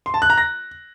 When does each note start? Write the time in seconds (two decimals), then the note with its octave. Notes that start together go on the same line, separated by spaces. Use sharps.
0.06 C6
0.14 A5
0.22 F#6
0.30 A#5
0.38 A#6